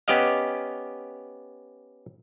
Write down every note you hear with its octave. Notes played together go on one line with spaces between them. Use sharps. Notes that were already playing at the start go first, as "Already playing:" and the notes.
B3 C#4 G4 D5 D#5 F5